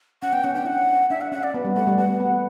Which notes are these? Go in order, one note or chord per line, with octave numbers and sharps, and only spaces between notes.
C#4 F#5
B3 G5
C#4 F#5
D4 G5
E4 F#5
D4
D4 E5
F#5
C#4 F#5
D5
B3
G3
A3 F#5
G3
B3 F#5
B3